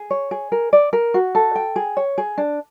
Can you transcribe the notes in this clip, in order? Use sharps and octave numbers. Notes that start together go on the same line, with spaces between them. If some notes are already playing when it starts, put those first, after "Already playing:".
Already playing: G#4
C#5
G#4
A#4
D5
A#4
F#4
A4
G5
G#4
C#5
G#4
D4